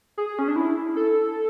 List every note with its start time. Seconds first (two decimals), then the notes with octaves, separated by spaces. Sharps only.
0.18 G#4
0.39 C#4
0.48 D4
0.56 E4
0.96 A4